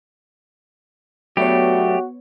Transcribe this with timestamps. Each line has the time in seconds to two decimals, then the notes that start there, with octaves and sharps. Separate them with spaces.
1.37 F#3 A3 B3 D4 F#4 G4 C#5